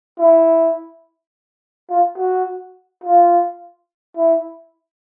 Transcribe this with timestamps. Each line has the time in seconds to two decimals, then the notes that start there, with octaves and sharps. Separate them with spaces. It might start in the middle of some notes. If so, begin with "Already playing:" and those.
0.19 E4
1.90 F4
2.18 F#4
3.04 F4
4.17 E4